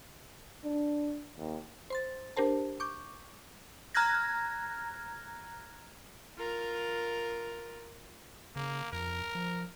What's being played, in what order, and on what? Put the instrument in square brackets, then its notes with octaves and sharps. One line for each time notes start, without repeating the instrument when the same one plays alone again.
[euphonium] D4
D#2
[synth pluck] C5 C6 A6
D4 G4 A#4 C5 A5
C#6 D6 G6
[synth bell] A#5 F6 F#6 G#6 A#6
[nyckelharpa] F4 A#4
[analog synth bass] C#3 [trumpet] A#3
[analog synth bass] F2 [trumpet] A#4
[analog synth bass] F3